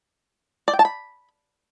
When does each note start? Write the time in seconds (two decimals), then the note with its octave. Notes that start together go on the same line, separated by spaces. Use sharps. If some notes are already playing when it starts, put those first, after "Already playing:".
0.68 D5
0.73 G5
0.79 A5
0.85 B5